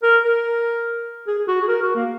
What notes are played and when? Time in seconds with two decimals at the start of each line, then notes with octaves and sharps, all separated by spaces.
0.02 A#4
0.24 A#4
1.27 G#4
1.38 G#4
1.47 F#4
1.61 G#4
1.68 A#4
1.82 F#4
1.95 A#3